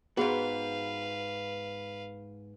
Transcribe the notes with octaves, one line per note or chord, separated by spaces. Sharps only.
G#2 B3 F#4 G#4 B4 F5